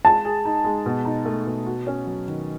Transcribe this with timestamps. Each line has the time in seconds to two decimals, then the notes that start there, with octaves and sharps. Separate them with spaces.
0.04 G#3 A5
0.25 G#4
0.45 D#4
0.64 G#3
0.86 B2
1.05 D#4
1.25 A3
1.47 B2
1.66 F#4
1.87 C#4
2.06 F#3
2.27 D#3